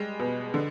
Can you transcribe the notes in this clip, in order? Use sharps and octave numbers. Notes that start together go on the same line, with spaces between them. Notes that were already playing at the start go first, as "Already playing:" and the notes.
Already playing: G3 G#3
B2
D3